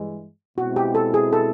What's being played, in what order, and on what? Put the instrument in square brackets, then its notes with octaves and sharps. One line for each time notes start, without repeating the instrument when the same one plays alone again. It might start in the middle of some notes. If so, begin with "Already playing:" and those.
Already playing: [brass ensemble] G2 E3 G#3
[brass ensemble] B2 G#3 C4 E4 [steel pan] F#4
[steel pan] G4
A4
G#4
A4